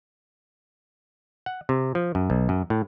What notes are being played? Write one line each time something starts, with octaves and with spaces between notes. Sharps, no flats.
F#5
C3
F3
F#2
B1
F#2
A2